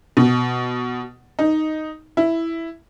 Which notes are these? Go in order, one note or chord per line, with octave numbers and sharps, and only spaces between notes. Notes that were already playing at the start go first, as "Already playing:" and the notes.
B2
D#4
E4